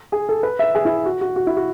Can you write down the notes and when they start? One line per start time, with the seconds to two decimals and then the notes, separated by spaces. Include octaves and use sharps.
0.12 G#4
0.29 A4
0.43 B4
0.59 E5
0.75 G#4
0.85 E4
1.06 F#4
1.21 F#4
1.36 F#4
1.47 E4
1.57 F#4